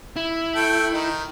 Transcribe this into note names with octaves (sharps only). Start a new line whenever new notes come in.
E4
A3 A4 G5
D#3 D#4